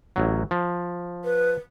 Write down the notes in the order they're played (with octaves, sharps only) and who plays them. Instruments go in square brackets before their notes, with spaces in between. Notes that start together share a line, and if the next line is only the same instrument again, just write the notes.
[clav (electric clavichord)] A1 F#3
F3
[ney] B4